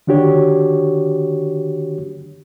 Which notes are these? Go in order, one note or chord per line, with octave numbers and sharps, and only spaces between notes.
D3 D#3 D4 F#4 G4 C#5